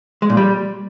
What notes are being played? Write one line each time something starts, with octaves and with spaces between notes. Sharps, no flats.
G#3
A#2
G3